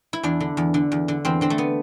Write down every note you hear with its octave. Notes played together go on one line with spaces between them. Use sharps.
E4
E2 D4
D3
E2
D3
E2
D3
E2 C4
D3 C4
A3
B3